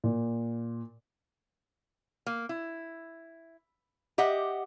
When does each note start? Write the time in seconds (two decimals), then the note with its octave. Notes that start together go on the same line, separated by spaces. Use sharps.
0.04 A#2
2.26 A#3
2.49 E4
4.18 G4 D#5 E5 F#5